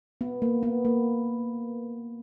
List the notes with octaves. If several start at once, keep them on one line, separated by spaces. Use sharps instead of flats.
B3
A#3
B3
A#3